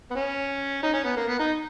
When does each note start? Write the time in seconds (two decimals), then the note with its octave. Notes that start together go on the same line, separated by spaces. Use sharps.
0.11 B3
0.15 C#4
0.83 D#4
0.93 C#4
1.04 B3
1.16 A#3
1.28 B3
1.39 D#4